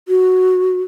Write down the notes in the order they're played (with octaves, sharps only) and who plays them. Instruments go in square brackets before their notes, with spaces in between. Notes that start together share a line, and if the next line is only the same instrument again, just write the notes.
[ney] F#4